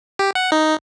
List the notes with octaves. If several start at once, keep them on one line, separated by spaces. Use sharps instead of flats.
G4
F#5
D#4